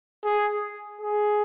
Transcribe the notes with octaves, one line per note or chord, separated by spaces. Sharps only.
G#4
G#4